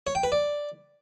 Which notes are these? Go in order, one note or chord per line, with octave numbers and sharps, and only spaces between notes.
C#5
G5
B4
D5